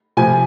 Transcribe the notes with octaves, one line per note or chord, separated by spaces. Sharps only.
C3 F3 G#5